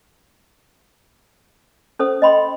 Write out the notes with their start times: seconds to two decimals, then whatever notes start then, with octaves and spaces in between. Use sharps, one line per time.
1.99 C#4 A4 C5 D#6
2.22 D#5 G5 B5 C6